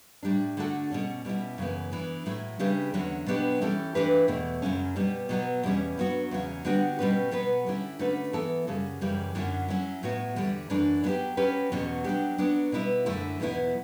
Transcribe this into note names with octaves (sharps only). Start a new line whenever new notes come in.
A2 G3 D4
D3 A3 D4 F#4 A4
B2 G3 C#4
B2 G3 C#4 E4
F#2 C#3 E3 B3
E3 B3 D4
A2 F#3 A3 E4
C#3 G3 D4 G4 B4
E2 D3 F#3 C#4 F#4
B2 F#3 B3 D4 G4
E3 G3 C#4 E4 A4
E3 A3 D4 G4 B4
E2 B2 A3
F#2 C#3 F#3 C#4
B2 G3 B3
B2 F#3 B3
E2 B2 G3 C#4
G2 F#3 B3 F#4
E2 C#3 F#3 C#4
D3 G3 B3 D4 F#4
B2 G3 C#4 F#4 B4
B2 F#3 B3 F#4 B4
D3 G3 C#4 E4
D3 A3 C#4 F#4 B4
E3 B3 F#4 A4
F#2 C#3 G3
F#2 C#3 E3 G3
F#2 D3 F#3 C#4 E4
F#3 C#4 E4
A2 F#3 B3 F#4
E2 D3 G3
F#2 E3 A3 D4
F#3 B3 E4 G4
F#3 C#4 G4 B4
E2 B2 F#3 C#4
F#3 B3 D4 G4
F#3 B3 D4
B2 G3 B3 E4
F#2 D3 A3 E4
E2 B2 F#3 B3 E4